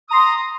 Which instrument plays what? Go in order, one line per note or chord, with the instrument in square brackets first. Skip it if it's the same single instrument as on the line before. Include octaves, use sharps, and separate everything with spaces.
[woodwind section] D#6
A#5
C6